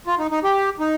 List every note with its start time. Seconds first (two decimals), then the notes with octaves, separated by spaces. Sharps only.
0.07 F4
0.19 D#4
0.31 D#4
0.44 G4
0.80 D#4